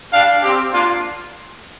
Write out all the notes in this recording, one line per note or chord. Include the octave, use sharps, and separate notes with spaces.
G3 D4 G4 F5
C4 G4
A#3 D4 F4